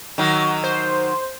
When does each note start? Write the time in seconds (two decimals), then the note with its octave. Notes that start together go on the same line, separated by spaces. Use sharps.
0.18 D#3 F#3
0.64 C5